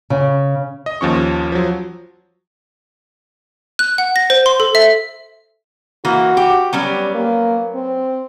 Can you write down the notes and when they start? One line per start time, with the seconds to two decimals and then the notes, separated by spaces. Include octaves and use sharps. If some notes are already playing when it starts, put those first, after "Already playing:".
0.10 C#3
0.86 D#5
1.01 D#2 F3 C#4 C#6
1.52 F3 F#3
3.79 F#6
3.98 F#5
4.16 A#6
4.30 C5
4.46 C6
4.60 A4
4.75 E5
6.05 E3 A#3 F#4
6.37 G4
6.73 F#3 G3 B3 C#4
7.15 A#3
7.75 C4